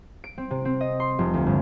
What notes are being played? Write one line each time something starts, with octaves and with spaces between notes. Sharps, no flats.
D7
C4
C3
C4
D#5
C6
F1
D2
G1